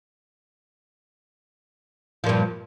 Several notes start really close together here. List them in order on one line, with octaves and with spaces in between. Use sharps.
F3 A#2 G2